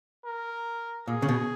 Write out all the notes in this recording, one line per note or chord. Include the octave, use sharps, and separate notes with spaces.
A#4
A#2 G#4
C#3
B2